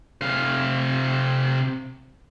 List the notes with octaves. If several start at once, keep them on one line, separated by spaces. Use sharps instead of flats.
C3 F5